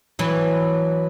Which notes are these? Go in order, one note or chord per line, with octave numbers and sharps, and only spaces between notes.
E3 F#3